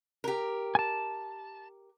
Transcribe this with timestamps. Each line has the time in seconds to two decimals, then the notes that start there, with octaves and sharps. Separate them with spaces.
0.24 G4 A#4
0.75 G#5 A5